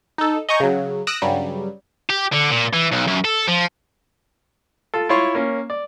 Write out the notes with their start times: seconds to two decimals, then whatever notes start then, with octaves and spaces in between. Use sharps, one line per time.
0.18 D#4 A4
0.49 D#5 G#5 A#5 C#6 D#6 G6
0.60 C#3 F#3
1.07 D#6 E6 F#6 A#6 D7 E7
1.22 G2 C#3 F#3 G3
2.10 G4
2.32 D3
2.50 A#2
2.73 E3
2.92 B1
3.07 F#2
3.24 A4
3.48 F3
4.94 F4 A4
5.09 E4 F4 C#5 C6 C#6
5.35 A#3 C#4
5.70 D5